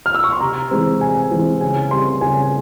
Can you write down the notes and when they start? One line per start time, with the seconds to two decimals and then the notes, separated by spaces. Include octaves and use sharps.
0.06 F6
0.14 E6
0.24 C#6
0.32 C6
0.40 C3 A#5
0.71 E3 G#3 C4
1.01 C3 G#5
1.31 E3 G#3 C4
1.61 C#3 G#5
1.91 G3 C4 C6
2.21 C#3 G#5